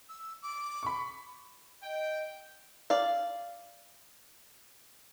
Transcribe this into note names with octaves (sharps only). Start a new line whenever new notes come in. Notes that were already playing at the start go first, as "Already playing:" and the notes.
E6
D6
B5 C#6
D#5 G5
D5 F5